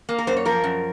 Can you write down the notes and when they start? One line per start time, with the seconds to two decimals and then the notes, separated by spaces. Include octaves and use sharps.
0.09 A#3
0.19 A#4
0.27 F#2 C5
0.37 C#5
0.45 F3 A#4
0.64 F#2